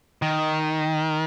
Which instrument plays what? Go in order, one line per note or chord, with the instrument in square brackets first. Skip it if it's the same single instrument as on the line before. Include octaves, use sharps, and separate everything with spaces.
[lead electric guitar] D#3